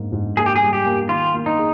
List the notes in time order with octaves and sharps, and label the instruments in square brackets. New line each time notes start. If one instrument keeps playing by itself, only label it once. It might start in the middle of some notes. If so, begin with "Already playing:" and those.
Already playing: [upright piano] G#2 A#3
G#2
[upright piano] A#3 [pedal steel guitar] G#4
[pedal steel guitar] G4
G#4
[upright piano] G3
[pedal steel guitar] G4
[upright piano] A#3
[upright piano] D#3 [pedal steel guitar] F4
[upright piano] A#3
[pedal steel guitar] D#4
[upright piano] G#4